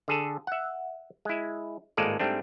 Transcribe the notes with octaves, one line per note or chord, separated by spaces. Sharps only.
D3 G#4 A4
E5 F#5
G#3 E4
G#1 A2 G#3 A#3 A4 D5
G#2 G3 A3 C4 D4